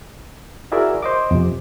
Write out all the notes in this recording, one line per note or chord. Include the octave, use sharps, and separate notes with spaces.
E4 F#4 G#4 A#4 D5 E5
C5 D#5 D6
F2 C3